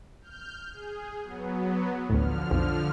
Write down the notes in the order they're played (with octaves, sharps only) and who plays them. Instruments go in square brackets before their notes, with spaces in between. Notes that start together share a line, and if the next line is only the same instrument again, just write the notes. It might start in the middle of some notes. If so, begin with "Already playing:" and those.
[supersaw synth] F6 G6
G#4
F#3 B3
[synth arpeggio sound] A1 D2 [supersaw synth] D3 F3 F6
[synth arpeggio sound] B1 F2